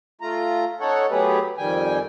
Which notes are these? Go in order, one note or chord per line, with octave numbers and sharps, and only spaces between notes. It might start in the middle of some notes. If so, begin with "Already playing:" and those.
A3 F4 A#5
C#4 D#4 A4 C#5 F#5
F#3 A3 B3 G4 G#4 B4
F2 D#3 G3 G5 G#5